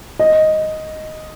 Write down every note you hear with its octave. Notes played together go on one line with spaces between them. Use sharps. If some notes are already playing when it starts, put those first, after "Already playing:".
D#5